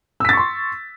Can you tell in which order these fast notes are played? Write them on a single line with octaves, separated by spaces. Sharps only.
E6 B6 A6 C#6 C6